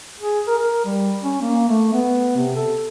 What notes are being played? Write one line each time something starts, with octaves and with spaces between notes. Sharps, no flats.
G#4
A#4
A#4
G3
C#4
A#3
A3
B3
C3
A4